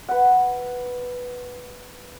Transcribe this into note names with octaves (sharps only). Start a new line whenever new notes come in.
B4 F#5